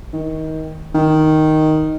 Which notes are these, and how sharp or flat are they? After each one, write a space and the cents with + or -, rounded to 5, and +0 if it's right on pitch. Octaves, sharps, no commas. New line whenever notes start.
D#3 +25
D#3 +0